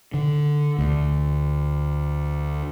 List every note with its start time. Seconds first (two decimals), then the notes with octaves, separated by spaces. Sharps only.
0.14 D3
0.78 D2